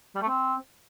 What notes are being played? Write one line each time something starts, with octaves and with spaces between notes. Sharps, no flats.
G3
A3
C4